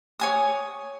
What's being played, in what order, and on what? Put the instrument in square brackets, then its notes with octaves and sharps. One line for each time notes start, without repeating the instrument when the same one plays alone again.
[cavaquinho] C#5 G#5 D#6